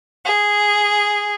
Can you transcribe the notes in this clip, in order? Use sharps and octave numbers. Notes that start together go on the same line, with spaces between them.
G#4